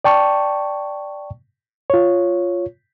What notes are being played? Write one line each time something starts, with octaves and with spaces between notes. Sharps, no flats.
D5 G5 A5 C#6
F4 C#5